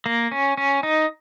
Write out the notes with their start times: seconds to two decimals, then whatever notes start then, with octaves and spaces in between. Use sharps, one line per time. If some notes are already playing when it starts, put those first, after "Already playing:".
0.06 A#3
0.32 C#4
0.57 C#4
0.83 D#4